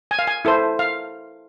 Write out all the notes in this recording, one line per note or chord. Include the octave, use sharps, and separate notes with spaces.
G#5
F5
G#5
E4 A4 C5
F5